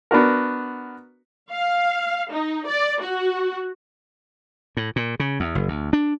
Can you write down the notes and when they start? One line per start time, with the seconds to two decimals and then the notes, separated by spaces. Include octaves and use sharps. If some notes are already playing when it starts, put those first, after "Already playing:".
0.11 B3 D4 F#4 A#4
1.51 F5
2.31 D#4
2.67 D5
3.01 F#4
4.77 A2
4.96 A#2
5.20 C#3
5.40 E2
5.55 F#1
5.68 D2
5.93 D4